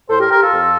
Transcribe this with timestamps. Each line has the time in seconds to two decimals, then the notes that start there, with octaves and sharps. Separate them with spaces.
0.10 A2 A4 C5
0.20 G4 A#4
0.31 G4 A#4
0.42 F4 A4
0.53 F2